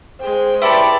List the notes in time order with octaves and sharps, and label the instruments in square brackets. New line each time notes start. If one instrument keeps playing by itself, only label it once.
[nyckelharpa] G#3 G5 [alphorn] C5
[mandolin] E4 G4 C#5 [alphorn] B4 [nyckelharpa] D5 [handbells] A5 B5 C6